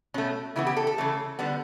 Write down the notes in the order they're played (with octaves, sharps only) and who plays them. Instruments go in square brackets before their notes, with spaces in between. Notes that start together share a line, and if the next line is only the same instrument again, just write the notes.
[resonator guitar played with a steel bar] B2 A3 C#4
C#3 E3 B3 E4
G4
A4
A4
C#3 E3 A3
D3 G3 B3